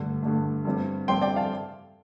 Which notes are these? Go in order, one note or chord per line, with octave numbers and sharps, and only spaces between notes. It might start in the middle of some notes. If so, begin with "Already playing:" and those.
Already playing: G2 D3 A3
G2 D3 A3
G2 G3 C4
G2 G3 C4 G5 C6
D5 G5
F5 A5